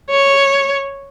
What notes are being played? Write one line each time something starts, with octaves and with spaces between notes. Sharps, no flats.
C#5